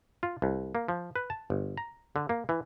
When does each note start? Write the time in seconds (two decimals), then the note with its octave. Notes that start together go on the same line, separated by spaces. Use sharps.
0.23 F4
0.42 C2
0.75 A#3
0.88 F3
1.16 B4
1.30 A5
1.50 G1
1.77 A#5
2.16 D3
2.29 A#3
2.49 E3